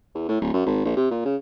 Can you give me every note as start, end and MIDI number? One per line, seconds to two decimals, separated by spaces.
0.15 0.24 40
0.29 0.37 45
0.41 0.51 26
0.54 0.62 42
0.66 0.83 32
0.85 0.92 34
0.97 1.08 48
1.11 1.21 46
1.25 1.36 49